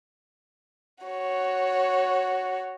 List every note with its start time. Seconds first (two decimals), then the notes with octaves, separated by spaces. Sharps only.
1.04 F#4 C#5